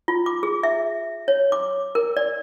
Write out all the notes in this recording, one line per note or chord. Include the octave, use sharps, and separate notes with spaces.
F4
D6
G#4
E5
C#5
D6
A#4
D5